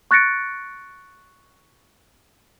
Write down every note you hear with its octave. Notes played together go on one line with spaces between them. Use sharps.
C#6 F#6 A6 A#6 C#7 D7